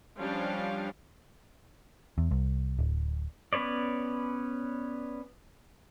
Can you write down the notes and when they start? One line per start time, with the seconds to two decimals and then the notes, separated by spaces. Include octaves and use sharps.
0.18 F3 G3 C#4 D4 F5
2.18 E2
2.31 C2
2.79 D1
3.53 B3 C#4 B4 C#5 D5